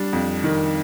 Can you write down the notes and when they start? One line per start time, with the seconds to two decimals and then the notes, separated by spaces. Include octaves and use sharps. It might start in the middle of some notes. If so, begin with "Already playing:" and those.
Already playing: G3 D4
0.13 F2
0.44 D#3